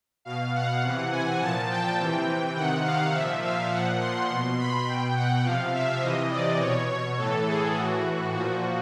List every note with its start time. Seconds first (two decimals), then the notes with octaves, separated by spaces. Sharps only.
0.25 B2 F5
0.54 F#5
0.82 C3 E3
1.11 G#5
1.41 A#2 F3 A5
1.69 G5
1.99 C3 E3
2.56 C3 D#3 F#5
2.85 F5
3.13 A#2 F3 E5
3.43 F5
3.71 A#2 F3 F#5
4.00 C6
4.28 B2 C6
4.59 B5
4.87 B2 G5
5.15 F#5
5.44 C3 F3 F5
5.73 E5
6.02 C3 E3 D#5
6.31 D5
6.59 B2 C#5
6.89 C#5
7.18 A2 E3 A4
7.47 G#4
7.75 A2 E3 F#4
8.33 A#2 F3 F#4